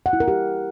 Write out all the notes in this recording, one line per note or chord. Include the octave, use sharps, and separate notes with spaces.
F#5
E4
A#4
G4